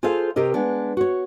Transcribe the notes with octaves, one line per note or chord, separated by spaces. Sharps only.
F4 G#4 A4 C5 F5
C3 G4 A#4 D#5
G#3 B3 D4
F#4 C#5